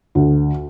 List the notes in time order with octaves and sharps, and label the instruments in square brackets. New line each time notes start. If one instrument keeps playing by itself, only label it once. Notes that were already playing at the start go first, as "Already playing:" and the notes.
[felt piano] D2